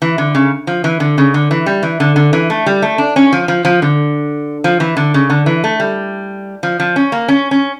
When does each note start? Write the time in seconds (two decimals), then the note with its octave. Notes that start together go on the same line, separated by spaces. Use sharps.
0.02 E3
0.18 D3
0.35 C#3
0.67 F3
0.84 E3
1.00 D3
1.18 C#3
1.34 D3
1.51 E3
1.66 G3
1.83 E3
2.00 D3
2.16 D3
2.33 E3
2.50 A3
2.66 G3
2.82 A3
2.98 D4
3.16 C#4
3.33 F3
3.48 F3
3.65 F3
3.82 D3
4.64 F3
4.80 E3
4.97 D3
5.14 C#3
5.30 D3
5.46 E3
5.64 A3
5.80 G3
6.63 F3
6.80 F3
6.96 C#4
7.12 A#3
7.28 C#4
7.51 C#4